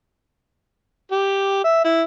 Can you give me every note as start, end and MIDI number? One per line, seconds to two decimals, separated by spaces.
1.12 1.60 67
1.64 1.81 76
1.84 2.02 64